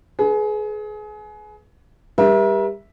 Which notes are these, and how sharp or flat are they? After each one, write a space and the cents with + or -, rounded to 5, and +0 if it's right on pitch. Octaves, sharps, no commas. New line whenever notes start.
G#4 +30 B4 +0
G3 +25 A#4 +45 E5 +0